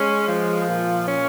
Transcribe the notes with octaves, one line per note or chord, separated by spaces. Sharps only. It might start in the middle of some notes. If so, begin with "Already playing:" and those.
Already playing: G#3 C#4
F3
A#2
C#4